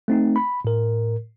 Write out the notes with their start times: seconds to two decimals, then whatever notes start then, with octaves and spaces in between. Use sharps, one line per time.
0.08 A3 C4 D#4
0.36 B5
0.65 A2 A#4